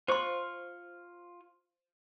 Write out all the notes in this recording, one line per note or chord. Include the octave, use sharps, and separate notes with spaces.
F4 C5 C6 C#6